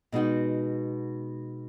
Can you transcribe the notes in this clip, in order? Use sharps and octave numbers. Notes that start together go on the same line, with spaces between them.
B2 G#3 D#4 F#4